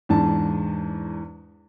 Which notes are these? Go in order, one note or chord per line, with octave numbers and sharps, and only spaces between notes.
E2 G#2 D4 A5